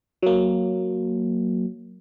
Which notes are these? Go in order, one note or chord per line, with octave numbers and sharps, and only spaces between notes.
F#3 A#3